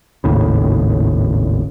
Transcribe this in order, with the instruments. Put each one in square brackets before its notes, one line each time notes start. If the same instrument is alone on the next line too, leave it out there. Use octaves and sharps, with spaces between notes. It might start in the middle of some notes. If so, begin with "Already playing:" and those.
[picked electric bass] G#1 D#2 A2 C#3